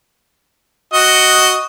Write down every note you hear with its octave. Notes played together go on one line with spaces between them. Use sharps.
F#4 D#5